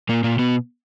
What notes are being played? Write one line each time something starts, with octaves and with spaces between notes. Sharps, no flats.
A#2 A#3
A#2 A#3
B2 B3